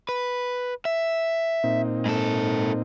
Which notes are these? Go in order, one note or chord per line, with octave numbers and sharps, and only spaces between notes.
B4
E5
A#2 C4 D#4
G#2 A4